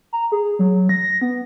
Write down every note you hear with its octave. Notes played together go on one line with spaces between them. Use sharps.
A#5
G#4
F#3
A#6
B3